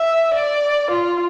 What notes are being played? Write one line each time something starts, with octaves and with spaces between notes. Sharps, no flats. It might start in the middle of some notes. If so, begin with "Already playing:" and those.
Already playing: E5
D5
F4